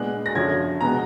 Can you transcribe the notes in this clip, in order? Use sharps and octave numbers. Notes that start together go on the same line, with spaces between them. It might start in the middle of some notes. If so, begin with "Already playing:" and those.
Already playing: A#2 G#3 B3 D4 F#6
A#6
F#2 D3 F3 G#6
B2 G#3 B3 A#5